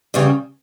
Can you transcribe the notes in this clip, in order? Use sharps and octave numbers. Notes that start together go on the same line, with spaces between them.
E2 C#3 G3